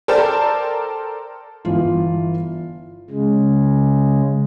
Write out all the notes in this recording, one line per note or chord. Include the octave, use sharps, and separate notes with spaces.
A4 A#4 C5 D5 G5 A5
G1 E3 F4
C#3 G#3